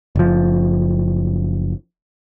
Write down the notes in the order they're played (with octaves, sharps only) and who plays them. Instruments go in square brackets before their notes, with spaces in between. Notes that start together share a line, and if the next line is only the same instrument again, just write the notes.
[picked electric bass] F#1 F3